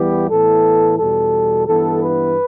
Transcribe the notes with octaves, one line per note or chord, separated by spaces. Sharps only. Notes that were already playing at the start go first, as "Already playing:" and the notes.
Already playing: E2 E3 G3 B3 G4
A2 E3 B3 A4
E2 B2 G3 A4
G2 E3 B3 A4
B4